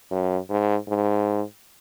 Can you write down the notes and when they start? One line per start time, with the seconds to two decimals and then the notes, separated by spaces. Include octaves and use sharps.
0.11 F#2
0.50 G#2
0.88 G#2